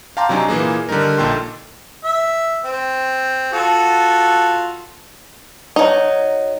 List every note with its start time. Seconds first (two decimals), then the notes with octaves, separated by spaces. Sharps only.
0.17 F5 G5 A5 A#5 C6 D6
0.29 C3 F#3 D4 D#4 G#5 A#5
0.49 A#2 E3 A#3 G#4
0.89 D3 D#3 G3 D#4 A#4
1.18 A#1 A#2 D#4 A4 G5 C6
2.04 E5
2.65 C4
3.53 F4 F#4 A4
5.76 F#3 D#4